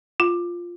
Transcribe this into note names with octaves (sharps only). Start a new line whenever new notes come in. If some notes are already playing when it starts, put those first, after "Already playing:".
F4